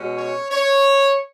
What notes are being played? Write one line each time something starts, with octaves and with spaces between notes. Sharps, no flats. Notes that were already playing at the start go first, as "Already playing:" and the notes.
Already playing: B2 G#3 C#4
C#5
C#5